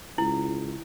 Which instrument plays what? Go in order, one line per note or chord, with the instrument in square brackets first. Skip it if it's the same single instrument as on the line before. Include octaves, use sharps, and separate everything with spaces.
[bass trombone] C#2 [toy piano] E4